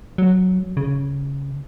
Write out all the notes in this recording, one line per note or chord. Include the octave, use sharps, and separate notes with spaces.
F#3
C#3